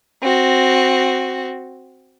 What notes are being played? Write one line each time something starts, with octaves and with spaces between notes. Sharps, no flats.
C4 F#4